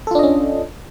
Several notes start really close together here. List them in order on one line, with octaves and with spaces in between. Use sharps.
A4 F4 D4 D#5 C#4